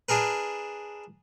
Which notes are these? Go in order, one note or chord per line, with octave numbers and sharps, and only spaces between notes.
D4 G#4 A#4 B4